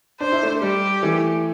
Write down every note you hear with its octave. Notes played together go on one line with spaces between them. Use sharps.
D4 C5
E4
A3 D4
G3 G4
E3 A3